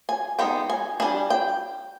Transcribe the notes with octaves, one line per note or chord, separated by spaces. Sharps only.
G#5
G#3 B3 D#4 G5
G#5
G3 D4 G#5
G5